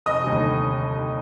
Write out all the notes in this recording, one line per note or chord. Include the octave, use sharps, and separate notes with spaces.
F1 D#5 D#6
D#2 D3 G3
F1